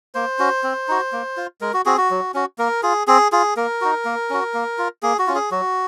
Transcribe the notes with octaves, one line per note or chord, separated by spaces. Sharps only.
A#3 C5
C#4 F#4
C4
D#4 F#4
A#3
F4
G#3 A#4
F#4
C4 F#4 G#4
F#4
F#3
C#4 F#4
A#3 A#4
F4 G#4
C4 G#4
F4 G#4
A#3 A#4
D#4 F#4
A#3
C#4 F#4
A#3
F4
A#3 G#4
F#4
C#4 F4
G#4
F#3 F#4